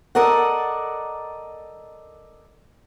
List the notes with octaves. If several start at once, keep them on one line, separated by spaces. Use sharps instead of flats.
A4 A#4 D5 D#5 F#5